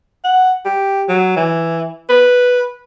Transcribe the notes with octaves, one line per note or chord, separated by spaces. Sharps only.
F#5
G4
F#3
E3
B4